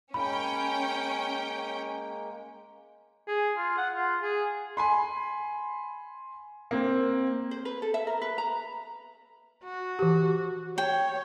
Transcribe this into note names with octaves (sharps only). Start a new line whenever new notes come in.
G#3 A#3 C#4 G5 B5
G#4
F4
F#5
F4
G#4
G#5 B5 C6
A#3 C4
C5
B4
A4
E5
A#4
B4
A#5
F#4
E3 G4
C#5 G5